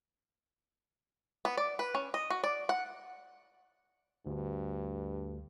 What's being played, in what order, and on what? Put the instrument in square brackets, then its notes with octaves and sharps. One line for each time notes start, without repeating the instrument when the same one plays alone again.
[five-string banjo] B3
D5
B4
C#4
D#5
F#4
D5
F#5
[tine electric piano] D2 [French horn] G2